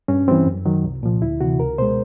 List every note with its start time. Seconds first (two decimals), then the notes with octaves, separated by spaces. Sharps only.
0.08 G2 C#4
0.28 E3 G3 C4
0.46 F#2
0.65 D#3 F#3
0.84 C2
1.03 A#2 F3
1.22 D2 E4
1.41 C3 E3 F#4
1.60 C#2 A#4
1.78 B2 G#3 C5